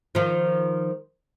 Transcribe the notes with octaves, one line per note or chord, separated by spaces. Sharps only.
D#3 F3